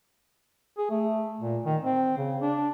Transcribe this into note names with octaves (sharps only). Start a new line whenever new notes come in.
G#4
A3
A#2
D#3
C4
C#3
D4